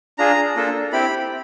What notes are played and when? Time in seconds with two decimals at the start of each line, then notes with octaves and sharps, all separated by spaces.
0.18 D4 F4 G#4 A#5
0.56 A#3 D4 F4 A4
0.93 C4 E4 G4 B5